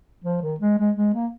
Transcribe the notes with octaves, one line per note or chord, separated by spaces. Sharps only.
F3
D#3
G#3
G#3
G#3
A#3